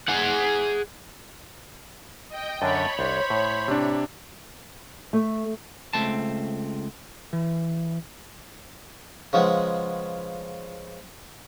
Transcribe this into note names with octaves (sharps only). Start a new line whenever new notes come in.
G#4 F#5
D#5 G5
F#2 D3 D4 C#5 A5 B5
C2 D4 C5
A2
C3 D4
A3
C#2 A3 C4 A5
E3
C#3 F3 G#3 B3